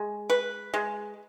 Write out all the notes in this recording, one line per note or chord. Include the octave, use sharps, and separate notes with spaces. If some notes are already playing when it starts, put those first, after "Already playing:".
Already playing: G#3
B4
G#3